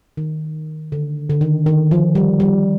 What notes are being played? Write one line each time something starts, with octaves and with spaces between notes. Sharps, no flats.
D#3
D3
D3
D#3
D#3
F3
G3
G3